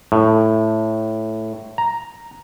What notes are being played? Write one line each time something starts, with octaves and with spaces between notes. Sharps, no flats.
A2
A#5